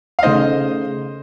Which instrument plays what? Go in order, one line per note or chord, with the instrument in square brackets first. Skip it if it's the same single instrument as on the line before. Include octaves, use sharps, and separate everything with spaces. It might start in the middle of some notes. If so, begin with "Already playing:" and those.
[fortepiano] F5
[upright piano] C#3 A3 D#4 [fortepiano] C5 D#5